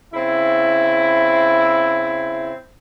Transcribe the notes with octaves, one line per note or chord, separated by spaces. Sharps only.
C#3 C4 E4